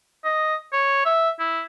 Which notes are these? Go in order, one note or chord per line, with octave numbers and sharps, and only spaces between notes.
D#5
C#5
E5
E4